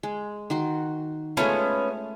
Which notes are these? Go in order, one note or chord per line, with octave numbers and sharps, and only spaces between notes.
G#3
D#3 F#4 C6
G#3 A3 B3 C#4 F4